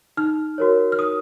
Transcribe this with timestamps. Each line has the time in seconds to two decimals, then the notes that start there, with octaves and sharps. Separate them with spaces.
0.17 D#4 F6
0.58 F#4 A#4 C#5
0.92 F6
0.98 D#4 D#6